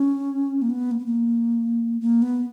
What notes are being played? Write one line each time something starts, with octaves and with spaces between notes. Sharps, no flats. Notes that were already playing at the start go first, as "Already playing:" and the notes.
Already playing: C#4
A#3
B3
A#3
B3
A#3
A#3
B3